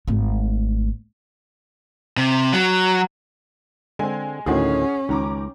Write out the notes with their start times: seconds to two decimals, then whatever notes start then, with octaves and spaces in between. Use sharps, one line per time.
0.08 G#1 A3
2.17 C3
2.53 F#3
3.99 D3 G#3 C4 G#5
4.46 D2 A2 D#3 C#4 F#4 G#4
5.09 C#2 D#3 A#5 D6